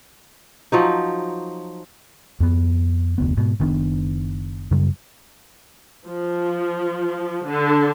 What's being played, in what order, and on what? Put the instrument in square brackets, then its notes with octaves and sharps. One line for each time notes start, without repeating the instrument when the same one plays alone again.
[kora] F3 F#3 D#4
[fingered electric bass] F2 B3
F1 D2 B3
G#2 B2
F#1 D#3 B3 D4
F#2 C#3 G3
[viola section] F3
D3